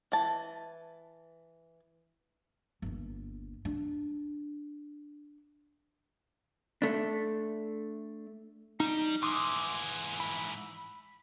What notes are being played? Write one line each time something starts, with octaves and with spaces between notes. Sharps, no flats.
E3 A5
G1 D#2
D4
A3 D4
G3 D#4
G#2 E3 C6 D6 D#6
B5